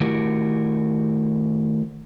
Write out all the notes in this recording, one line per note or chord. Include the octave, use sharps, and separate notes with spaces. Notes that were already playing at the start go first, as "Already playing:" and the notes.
D#3 A3 E4 F#4 G4 A#4